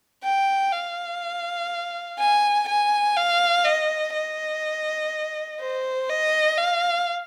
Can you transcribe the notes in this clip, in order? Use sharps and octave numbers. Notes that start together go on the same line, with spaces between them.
G5
F5
G#5
G#5
F5
D#5
D#5
C5
D#5
F5